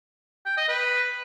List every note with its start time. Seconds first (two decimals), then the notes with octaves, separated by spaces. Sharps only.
0.46 G5
0.57 D#5
0.69 B4